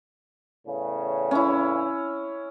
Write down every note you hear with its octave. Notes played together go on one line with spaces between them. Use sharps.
E2 A2 C#3
C#4 E4